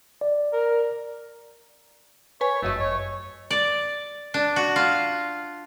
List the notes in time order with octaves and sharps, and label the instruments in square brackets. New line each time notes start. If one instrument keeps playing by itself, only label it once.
[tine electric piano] D5
[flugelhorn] A#4
[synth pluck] B4 G#5 [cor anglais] C#5
[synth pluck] G1 F#2 D#5 [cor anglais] A3
[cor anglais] C#5
[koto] D5
D4
F#4
F4